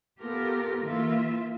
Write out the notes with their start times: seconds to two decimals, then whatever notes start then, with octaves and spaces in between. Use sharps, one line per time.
0.20 B3 F4 G4 A4 A#4
0.83 E3 A#3 F4 E5